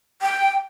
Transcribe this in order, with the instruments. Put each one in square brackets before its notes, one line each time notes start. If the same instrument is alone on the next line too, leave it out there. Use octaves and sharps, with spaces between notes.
[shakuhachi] G5